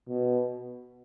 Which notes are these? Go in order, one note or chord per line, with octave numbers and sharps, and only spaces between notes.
B2